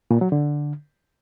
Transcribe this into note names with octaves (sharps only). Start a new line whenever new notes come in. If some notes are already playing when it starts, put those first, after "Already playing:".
A#2
F#3
D3